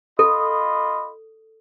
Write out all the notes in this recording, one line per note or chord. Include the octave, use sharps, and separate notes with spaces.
F4 A4 D#5 B5